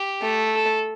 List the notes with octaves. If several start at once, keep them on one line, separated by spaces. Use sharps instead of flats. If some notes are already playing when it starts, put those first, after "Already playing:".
Already playing: G4
A3
A4